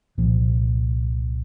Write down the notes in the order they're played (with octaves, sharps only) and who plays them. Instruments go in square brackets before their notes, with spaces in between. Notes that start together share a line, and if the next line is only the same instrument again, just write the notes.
[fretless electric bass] C2 A#2 F3